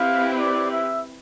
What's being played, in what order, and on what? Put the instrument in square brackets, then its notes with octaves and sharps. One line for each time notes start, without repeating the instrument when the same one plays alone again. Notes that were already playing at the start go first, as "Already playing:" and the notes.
Already playing: [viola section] C4 E4 G4 B4 [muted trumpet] F5
[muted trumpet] D5
E5